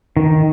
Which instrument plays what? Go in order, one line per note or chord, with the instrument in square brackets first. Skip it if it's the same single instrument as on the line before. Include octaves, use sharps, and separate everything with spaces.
[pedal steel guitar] D#3